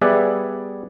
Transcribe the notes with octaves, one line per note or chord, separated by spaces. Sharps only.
G3 B3 G#4 D5 E5 F#5